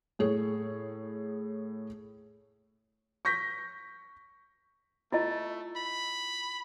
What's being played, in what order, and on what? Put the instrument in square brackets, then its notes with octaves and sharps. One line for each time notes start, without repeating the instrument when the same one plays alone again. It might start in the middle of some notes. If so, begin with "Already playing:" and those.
[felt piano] A2 G#4 C#5
C#6 G6 A#6 B6
[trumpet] A3 [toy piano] E4 F4 D#5
[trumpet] B5